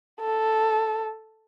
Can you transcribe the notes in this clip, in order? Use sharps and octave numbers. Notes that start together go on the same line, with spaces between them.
A4